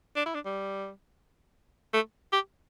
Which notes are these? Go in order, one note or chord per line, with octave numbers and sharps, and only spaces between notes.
D4
E4
D4
G3
A3
G4